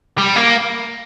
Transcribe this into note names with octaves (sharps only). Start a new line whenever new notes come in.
G3
A#3